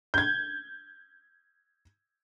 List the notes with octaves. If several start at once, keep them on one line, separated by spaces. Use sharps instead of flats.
G6 G#6